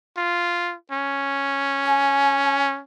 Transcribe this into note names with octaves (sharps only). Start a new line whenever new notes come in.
F4
C#4
G#5